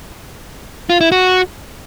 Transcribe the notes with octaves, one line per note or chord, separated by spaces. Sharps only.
F4
E4
F#4